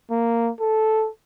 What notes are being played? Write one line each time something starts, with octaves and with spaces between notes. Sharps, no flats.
A#3
A4